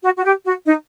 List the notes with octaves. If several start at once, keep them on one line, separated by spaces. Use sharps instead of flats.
F#4
F#4
G4
F#4
D#4